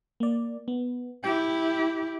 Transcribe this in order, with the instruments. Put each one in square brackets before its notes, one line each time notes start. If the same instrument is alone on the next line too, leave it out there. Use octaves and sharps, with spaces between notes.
[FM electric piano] A#3 D5
B3
[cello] E4 G4 [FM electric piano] G5